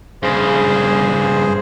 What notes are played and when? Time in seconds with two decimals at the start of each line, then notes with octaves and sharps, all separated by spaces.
0.23 G2 C#3 G#4 C5